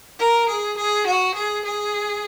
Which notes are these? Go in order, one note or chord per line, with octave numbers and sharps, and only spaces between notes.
A#4
G#4
G#4
F#4
G#4
G#4